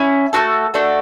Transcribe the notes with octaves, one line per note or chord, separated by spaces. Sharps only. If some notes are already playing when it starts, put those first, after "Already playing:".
Already playing: C#4 E4
A3 D4 F#4 A4
A3 D4 F#4 A4